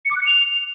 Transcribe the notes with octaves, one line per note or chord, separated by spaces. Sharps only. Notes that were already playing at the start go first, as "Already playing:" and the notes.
C#7
D6
F#6
C#7
F7